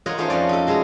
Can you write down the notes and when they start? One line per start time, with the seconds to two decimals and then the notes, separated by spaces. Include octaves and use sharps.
0.06 F4 A#4 C#5 D#5 F#5
0.18 A3 C#4 D#4 F4 C5
0.30 F2 C#4 D5
0.49 D#4 A4
0.67 B2 G#3 E4 D#5 A#5